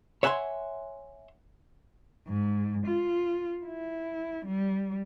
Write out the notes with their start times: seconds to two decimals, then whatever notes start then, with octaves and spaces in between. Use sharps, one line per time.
0.23 C#5 E5 F#5 G#5 A#5 C6
2.27 G#2
2.86 F4
3.65 E4
4.46 G3